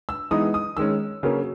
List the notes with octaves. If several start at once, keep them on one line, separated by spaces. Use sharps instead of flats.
E6
E3 G#3 B3 D#4 D#6
D#6
D#3 G#3 C#4 E6
C#3 F#3 A#3 C#4